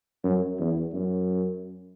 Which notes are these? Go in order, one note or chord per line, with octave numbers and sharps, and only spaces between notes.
F#2
E2
F#2